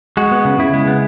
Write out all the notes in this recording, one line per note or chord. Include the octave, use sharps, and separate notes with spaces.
G#3 F#4
B3
C#3
C#3 E4
G#3
B3